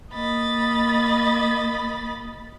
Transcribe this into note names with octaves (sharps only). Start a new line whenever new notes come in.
A#3 D#5 B5 A6